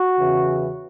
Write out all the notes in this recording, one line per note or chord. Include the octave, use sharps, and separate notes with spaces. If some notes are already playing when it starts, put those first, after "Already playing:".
Already playing: F#4
E2 C#3 E3